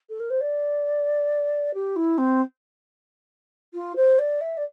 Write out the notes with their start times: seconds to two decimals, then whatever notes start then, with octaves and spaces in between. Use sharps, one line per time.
0.09 A4
0.20 A#4
0.30 C5
0.41 D5
1.74 G4
1.96 E4
2.18 C4
3.74 F4
3.96 C5
4.19 D5
4.41 E5
4.57 D5